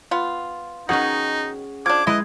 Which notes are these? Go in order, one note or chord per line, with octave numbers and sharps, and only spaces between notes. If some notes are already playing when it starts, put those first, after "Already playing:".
B3 F4
B2 D#3 C#4 D#4 G#4 F#5
F3 D4 D6 G#6
G#3 E4 B4 D#5